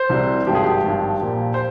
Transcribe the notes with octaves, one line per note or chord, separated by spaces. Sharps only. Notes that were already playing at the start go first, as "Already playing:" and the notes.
Already playing: C5
C2 C3 G3
G#1 G2 F3 G4
G#4
G4
G#1 G2 F3
A#1 A#2 F3
C5